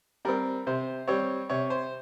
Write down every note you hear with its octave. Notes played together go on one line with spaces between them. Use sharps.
G3 C4 A#4
C3 C5
G3 C4 C#5
C3 C#5
C5